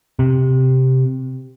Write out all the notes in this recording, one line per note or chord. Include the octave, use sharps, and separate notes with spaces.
C3